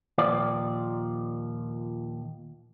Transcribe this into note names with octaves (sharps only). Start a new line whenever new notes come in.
D#2 A#2 F3 D5